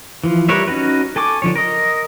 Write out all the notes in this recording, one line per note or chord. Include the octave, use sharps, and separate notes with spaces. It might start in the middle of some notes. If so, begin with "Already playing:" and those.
E3 F3
G3 A#4 B4 C#5 E5
C#4 D#4 F#4 B4
A4 G#5 C#6 D6
D3 F3 C#5
A#4 D#5